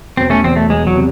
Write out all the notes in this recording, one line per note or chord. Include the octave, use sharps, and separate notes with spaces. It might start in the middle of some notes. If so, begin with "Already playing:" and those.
E1 C4
A3 C#4
E2 C4
A3
E1 G#3
F#3
C3